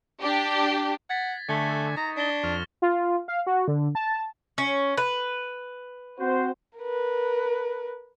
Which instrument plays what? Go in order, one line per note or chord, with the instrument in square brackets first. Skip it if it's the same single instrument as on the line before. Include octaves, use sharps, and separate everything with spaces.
[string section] D4 G4
[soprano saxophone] F#5 [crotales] G#6 A6 B6
[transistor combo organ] D3 G#5 [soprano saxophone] A3 [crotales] C#6 C#7
[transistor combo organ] D#4 [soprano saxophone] A#5
[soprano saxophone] D4 [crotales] A6 A#6 G7
[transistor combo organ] F2 F6 [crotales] C#6
[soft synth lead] F4
F5
F#4
D3
A5
[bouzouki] C#4
B4
[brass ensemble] C4 F#4 C5
[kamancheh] A#4 B4